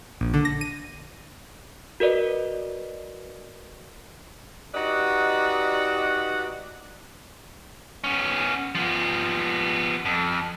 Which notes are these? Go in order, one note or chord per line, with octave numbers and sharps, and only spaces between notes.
A#1
D3
A#6
D#7
F#4 A#4 B4 D5 D#5
D#4 F#4 G4 B4 D5 D#5
B3 C#4
F3 B3
F2